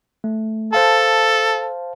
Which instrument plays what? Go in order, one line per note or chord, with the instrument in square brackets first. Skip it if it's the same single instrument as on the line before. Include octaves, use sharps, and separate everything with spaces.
[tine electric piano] A3
[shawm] A4 [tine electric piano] C5 F5 A5